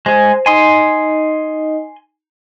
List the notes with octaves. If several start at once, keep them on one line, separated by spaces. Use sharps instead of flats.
G#3 G#4 C5
D#4 D#5 G#5 C6